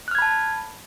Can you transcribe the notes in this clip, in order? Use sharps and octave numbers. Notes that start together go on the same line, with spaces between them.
A5 B5 F6 F#6 G#6